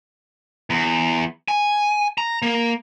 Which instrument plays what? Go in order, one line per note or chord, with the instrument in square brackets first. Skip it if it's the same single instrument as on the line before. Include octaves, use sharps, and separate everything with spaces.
[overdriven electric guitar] E2
G#5
A#5
A#3